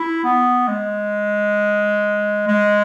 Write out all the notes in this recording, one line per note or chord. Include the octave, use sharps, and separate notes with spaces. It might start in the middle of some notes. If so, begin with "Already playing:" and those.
Already playing: E4
B3
G#3
G#3